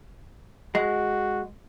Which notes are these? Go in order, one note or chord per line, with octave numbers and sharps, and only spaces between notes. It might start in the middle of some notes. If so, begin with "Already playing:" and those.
G#3 F#4